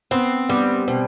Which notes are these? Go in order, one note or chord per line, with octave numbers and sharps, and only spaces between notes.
B3 C4
G3 B3
B2 C4